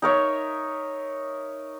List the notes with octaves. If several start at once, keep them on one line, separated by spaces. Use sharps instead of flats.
D#4 A#4 C#5 E5